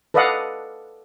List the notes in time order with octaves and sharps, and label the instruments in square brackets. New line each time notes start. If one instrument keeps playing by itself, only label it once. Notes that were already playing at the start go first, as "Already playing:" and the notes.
[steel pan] A4 B4 D5 D#5 F5 F#5